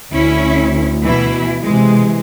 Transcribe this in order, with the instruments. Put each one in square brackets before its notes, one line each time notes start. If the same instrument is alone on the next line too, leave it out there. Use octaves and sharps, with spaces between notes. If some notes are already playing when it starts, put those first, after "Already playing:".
[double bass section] D2 [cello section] C#4 E4
[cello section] B2 E3 E4
[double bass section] C3 E3 [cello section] G#3